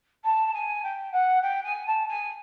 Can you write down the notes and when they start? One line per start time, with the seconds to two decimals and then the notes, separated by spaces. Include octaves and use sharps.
0.24 A5
0.53 G#5
0.83 G5
1.12 F#5
1.42 G5
1.63 G#5
1.86 A5
2.08 G#5